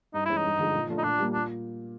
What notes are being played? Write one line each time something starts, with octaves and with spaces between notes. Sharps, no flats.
G2 D#4
E3 G#3 C#4 E4
D#4
G2
D3 F3 G#3
A#2
F3 A3 D4 F4
D#4
A#2 D4
G3 A#3
A#2 D4